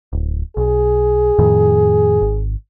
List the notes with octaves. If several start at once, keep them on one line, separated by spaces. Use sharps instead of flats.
D1
B1 G#4
F2 A2 D#3
G#1